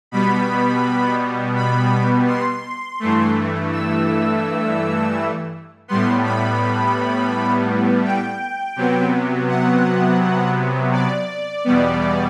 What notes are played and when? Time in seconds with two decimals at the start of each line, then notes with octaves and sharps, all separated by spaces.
0.11 B2 G3 B3 B5
1.56 B5
2.27 C6
3.00 G2 E3 A3
3.72 E6
5.88 A2 G3 B3 C6
6.24 B5
8.05 G5
8.76 C3 F#3 B3
9.48 F#5
10.92 D5
11.64 E2 B2 G3 B3